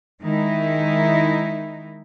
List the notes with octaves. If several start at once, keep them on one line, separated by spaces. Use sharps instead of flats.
D#3 G#3 D#4 E4